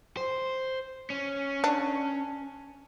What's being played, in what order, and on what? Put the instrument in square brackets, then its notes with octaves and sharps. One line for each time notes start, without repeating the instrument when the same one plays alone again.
[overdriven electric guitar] C5
C#4
[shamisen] D4